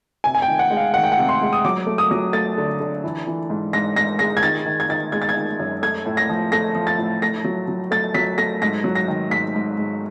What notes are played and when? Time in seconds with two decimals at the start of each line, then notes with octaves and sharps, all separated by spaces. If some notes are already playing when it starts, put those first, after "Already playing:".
0.24 C3 G#5
0.35 G#5
0.42 G5
0.48 D#3
0.59 F#5
0.71 G#3
0.77 F5
0.94 D#3 F#5
1.04 G5
1.12 F#5
1.18 C3
1.29 C6
1.41 G#3
1.53 D#6
1.64 F#3 D6
1.87 A3
1.98 D#6
2.11 F#3
2.33 A3 A6
2.58 D3
2.80 D3
3.04 E3
3.27 E3
3.50 G#2
3.73 G#2 A#6
3.96 G#2 A#6
4.19 G#3 A#6
4.37 G#6
4.43 D#3 A6
4.66 D#3
4.80 G#6
4.89 D#3 A6
5.12 G#3 G#6
5.22 A6
5.29 G#6
5.36 D#3
5.59 F#2
5.82 A3 G#6
6.06 A2
6.17 A#6
6.29 F3
6.52 A3 A#6
6.75 F3
6.87 A6
6.98 A2
7.22 A3 A#6
7.44 F#3
7.68 F#3
7.91 A3 A6
8.14 F#3 B6
8.38 A3 A#6
8.62 G#2 A#6
8.84 F#3
8.95 A#6
9.08 D#3
9.30 G#2 B6
9.55 G#2
9.78 G#2